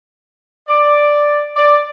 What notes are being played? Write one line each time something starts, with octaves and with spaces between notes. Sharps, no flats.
D5
D5